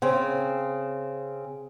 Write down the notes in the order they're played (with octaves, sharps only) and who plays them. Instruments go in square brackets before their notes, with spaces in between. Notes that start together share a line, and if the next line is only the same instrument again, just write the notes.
[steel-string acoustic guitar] C#3 C4